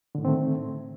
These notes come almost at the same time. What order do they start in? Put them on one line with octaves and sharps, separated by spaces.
D3 A2 D#3 C4 A3